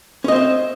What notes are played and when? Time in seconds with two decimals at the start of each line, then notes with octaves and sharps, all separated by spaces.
0.24 C#4
0.28 D#5
0.32 C4
0.36 E5